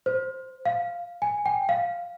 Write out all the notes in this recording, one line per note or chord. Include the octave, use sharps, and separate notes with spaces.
C5
F5
G#5
G5
F5